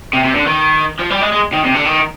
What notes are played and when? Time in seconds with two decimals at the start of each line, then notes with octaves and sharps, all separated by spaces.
0.13 C3
0.24 C3
0.35 D3
0.46 D#3
0.99 F3
1.10 G3
1.21 G#3
1.33 G#3
1.53 D#3
1.65 C3
1.74 D3
1.85 D#3